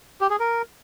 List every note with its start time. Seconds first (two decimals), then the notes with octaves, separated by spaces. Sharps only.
0.21 G4
0.30 G#4
0.40 A#4